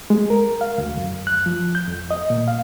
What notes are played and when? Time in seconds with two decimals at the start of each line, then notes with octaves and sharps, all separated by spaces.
0.10 G#3
0.30 A#4
0.61 F5
0.78 D2
0.97 F#2
1.27 F#6
1.46 F3
1.75 G6
1.88 F2
2.11 D#5
2.30 A#2
2.48 F5